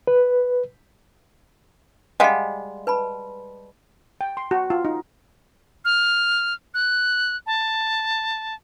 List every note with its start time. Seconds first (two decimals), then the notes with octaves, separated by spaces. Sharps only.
0.07 B4
2.20 G3 G#3 D#5 F5 F#5
2.87 B4 A5 B5
4.21 G5
4.37 C6
4.51 F#4
4.70 F4
4.85 D#4
5.85 F6
6.74 F#6
7.46 A5